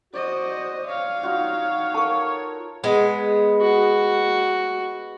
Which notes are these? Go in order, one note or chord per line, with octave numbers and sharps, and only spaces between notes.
F#4 C5 D5 D#5
C#5 F5
D#4 F4 F#4
A4 A#4 A5 C#6
G#3 B3
F#4